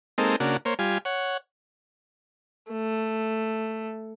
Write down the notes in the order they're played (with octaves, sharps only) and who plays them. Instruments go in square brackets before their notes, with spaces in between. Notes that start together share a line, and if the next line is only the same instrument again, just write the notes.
[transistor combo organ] G#3 A#3 C4 D#4 A4
C#3 A#3 D4 F#4
A#3 C5 C#5
G3 F4 G#5
C#5 F#5
[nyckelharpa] A3